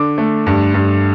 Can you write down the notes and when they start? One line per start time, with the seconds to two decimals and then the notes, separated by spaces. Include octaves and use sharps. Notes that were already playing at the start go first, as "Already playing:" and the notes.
Already playing: D3 D6
0.18 A3
0.46 G2
0.74 G2